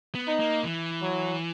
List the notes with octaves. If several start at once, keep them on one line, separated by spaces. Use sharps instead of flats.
B3
D#4
A#3
E3
F#3